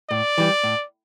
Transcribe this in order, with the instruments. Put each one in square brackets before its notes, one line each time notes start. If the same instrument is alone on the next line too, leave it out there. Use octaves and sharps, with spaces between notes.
[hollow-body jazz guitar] A2 [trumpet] D5
[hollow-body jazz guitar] E3 G3
A2